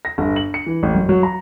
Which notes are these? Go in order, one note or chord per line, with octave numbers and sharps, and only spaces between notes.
A#6
G1
F#7
C#7
E3
A1
F#2
F#3
A#5